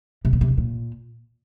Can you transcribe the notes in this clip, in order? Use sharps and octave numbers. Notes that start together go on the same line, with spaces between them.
C3
B2
C3
E2
A#2